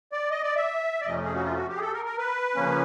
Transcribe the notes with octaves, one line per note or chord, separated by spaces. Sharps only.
D5
D#5
D5
E5
D5
F2 C3 F3 A3 C#4 D#5
G#4
F#4
F4
F#4
G4
G#4
A4
A#4
A#4
B4
C#3 F3 A#3 C#4